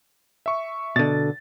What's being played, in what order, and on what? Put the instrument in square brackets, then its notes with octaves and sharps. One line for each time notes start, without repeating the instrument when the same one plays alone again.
[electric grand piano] E5 C#6
[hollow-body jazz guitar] B2 D3 [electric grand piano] A6